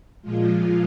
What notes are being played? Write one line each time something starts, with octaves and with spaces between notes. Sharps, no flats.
A#2 F3 G#3 F4